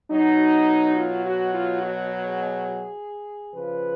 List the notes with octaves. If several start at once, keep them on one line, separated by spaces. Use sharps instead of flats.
B2 F#3 D#4
F4
F#4
F4
F#4
G#4
C#3 F3 B4